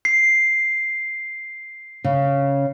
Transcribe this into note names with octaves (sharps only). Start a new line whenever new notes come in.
C7
C#3